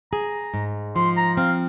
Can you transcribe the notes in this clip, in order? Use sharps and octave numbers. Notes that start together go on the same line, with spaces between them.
G#4 A#5
G#2
F3 C6
A#5
C4 F5